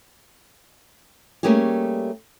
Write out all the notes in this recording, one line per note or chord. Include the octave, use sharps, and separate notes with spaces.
G3 A3 A#3 C#4 G4 G#4